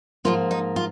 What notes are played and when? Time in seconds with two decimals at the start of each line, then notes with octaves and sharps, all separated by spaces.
0.25 G#2 F3 A#3 F4
0.51 D#4
0.76 F4